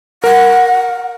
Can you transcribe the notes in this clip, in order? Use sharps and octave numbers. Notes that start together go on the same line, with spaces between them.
A#4 F#5